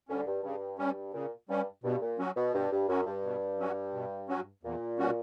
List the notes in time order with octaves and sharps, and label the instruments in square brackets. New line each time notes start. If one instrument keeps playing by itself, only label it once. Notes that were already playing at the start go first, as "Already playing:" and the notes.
[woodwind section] D2 D3 [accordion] G3 C#4
[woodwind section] G2
[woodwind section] G2 [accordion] C#3
[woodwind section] G2 [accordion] G3 C#4
[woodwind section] A#2 [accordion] C#3
[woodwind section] G2 [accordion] G3 C#4
[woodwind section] G2 [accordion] B2
[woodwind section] A#2
[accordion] F#3 C#4 F#4
[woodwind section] B2
[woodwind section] G2 [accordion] B2
[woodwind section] G2
[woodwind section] F#2 [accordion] F#3 C#4 F#4
[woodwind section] G2
[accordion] B2
F#3 C#4 F#4
B2
F#3 C#4 F#4
[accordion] E2 [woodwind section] A#2
[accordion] B2 G3 C#4 F#4